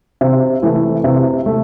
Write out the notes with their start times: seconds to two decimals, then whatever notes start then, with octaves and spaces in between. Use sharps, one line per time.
0.21 C3
0.63 E3 A3
1.04 C3
1.46 A3